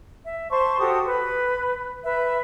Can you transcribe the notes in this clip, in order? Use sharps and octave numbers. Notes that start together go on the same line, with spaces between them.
E5
C5 A5 C6 C#6
F#4 G4 A4 D#6
B4
B4 E5